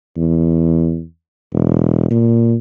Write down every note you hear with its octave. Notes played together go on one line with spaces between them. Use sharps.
E2
E1
A#2